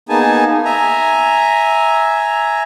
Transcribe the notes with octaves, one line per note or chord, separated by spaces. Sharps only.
A#3 B3 D#4 G#4 G#5 A5
E5 G#5 A#5